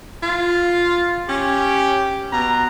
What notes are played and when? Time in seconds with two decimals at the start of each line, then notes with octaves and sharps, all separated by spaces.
0.23 F4
1.29 C#4 G4
2.33 B2 A#5